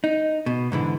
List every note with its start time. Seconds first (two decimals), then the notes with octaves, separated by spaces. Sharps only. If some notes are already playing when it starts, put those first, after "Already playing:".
0.04 D#4
0.46 B2
0.72 G#2 D3 E3